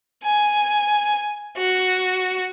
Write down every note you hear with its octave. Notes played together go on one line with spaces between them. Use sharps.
G#5
F#4